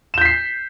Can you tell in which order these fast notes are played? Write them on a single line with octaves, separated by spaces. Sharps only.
E7 G6 B6 C7